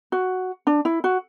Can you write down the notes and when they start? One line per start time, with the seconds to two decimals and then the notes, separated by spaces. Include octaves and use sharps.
0.12 F#4
0.67 D4
0.85 E4
1.04 F#4